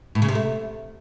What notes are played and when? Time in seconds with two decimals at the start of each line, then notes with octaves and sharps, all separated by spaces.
0.15 A2
0.22 C#3
0.29 C3
0.35 A3